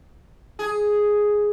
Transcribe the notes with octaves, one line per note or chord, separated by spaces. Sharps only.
G#4